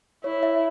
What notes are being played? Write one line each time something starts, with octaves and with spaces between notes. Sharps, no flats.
E4 C#5
E5